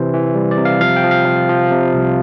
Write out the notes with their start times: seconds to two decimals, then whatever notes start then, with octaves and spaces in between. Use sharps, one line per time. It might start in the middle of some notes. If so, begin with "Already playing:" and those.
Already playing: C3 E3 C5
0.14 E3
0.35 G3
0.51 D5
0.58 C3
0.65 F5
0.81 F3 F5
0.96 G5
1.04 F3
1.11 F5
1.26 F3
1.49 F3
1.71 C3
1.94 C2